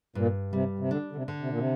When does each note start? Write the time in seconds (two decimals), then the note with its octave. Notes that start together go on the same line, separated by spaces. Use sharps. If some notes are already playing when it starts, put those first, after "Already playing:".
0.15 G2 A#2
0.53 C3 G3
0.79 C3
0.90 D3 D4
1.12 D3
1.16 C3
1.28 D3
1.40 C3
1.50 A#2
1.58 C3